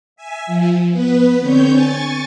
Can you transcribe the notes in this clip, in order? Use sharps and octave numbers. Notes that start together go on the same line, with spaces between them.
E5 G#5
F3
B3 B4
D3 C4 C#5 G6
G#5 C#6 A6